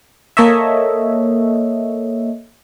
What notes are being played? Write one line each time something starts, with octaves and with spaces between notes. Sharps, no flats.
A#3 A4 C#5 D#5 E5